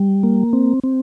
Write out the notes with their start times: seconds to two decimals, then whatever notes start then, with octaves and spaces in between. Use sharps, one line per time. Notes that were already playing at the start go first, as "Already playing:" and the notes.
Already playing: G3
0.23 A#3
0.53 C4
0.83 C4